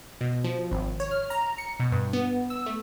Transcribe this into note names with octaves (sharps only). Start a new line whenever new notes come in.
B2
F3
G#1
C#5
F6
A#5
C#7
B2
G2
B3
E6
A3